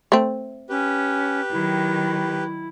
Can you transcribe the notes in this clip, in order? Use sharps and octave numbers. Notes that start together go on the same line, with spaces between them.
A3 C4
C#4 G4 B4
D#3 F#3 E4